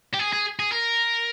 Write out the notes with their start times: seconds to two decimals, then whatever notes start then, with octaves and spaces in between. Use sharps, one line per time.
0.14 G4
0.19 G#4
0.33 G#4
0.60 G#4
0.72 A#4